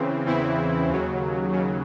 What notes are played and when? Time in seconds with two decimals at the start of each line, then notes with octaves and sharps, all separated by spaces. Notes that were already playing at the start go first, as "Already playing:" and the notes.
Already playing: C#3 E3 C4
0.26 E2 C#3 E3 C4 E4
0.88 D#2 C#3 F#3
1.52 D#2 C#3 F#3